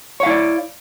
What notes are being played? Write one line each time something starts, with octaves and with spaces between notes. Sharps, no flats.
E4 C#5 D5 F5